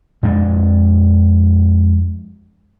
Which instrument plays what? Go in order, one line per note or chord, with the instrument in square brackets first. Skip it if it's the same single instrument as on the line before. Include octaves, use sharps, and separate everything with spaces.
[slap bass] F2 G#3 D4